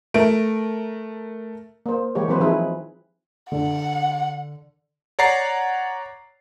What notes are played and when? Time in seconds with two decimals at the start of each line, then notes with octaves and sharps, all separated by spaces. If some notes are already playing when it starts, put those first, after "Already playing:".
0.14 A3 A#4 D7
1.86 A#3 C5
2.15 E3 G#3 A#3 G4 C#5
2.28 E3 F#3 C4 B4 C5
2.40 F3 C4 D#4 E4 G#4 B4
3.52 D3 F#5
5.19 C#5 D5 F#5 A#5 A6 C7